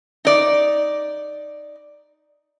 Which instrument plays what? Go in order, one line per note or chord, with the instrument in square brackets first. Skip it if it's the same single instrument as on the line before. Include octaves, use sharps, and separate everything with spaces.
[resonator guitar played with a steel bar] D#4 D5